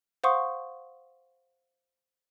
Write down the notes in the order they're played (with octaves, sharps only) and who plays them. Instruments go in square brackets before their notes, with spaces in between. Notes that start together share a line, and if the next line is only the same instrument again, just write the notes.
[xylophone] C5 F5 F#5 C6 C#6 D#6